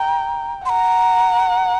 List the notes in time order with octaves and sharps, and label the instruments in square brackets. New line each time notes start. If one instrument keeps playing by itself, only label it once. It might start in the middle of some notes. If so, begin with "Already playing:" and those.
Already playing: [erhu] G5 [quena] A#5
[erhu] F#5 [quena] C6
[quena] A#5